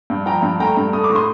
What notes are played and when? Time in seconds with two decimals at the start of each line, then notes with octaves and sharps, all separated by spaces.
0.10 G2
0.26 F3 G5 A#5
0.42 G2
0.60 A3 G5 A#5
0.77 G2
0.93 A3 D#6
1.04 D6
1.10 A2
1.15 C6 D#6